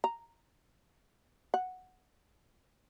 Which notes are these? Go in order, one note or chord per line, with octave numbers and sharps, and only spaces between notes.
A#5
F#5